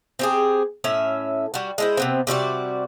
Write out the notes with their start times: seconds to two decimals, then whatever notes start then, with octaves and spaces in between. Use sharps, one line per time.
0.19 C4 G4 G#4
0.84 A2 C#4 E5
1.54 G3 F#4
1.78 G#3 E4 C5
1.97 C3 B3 C4
2.27 C3 G3 F#4 D5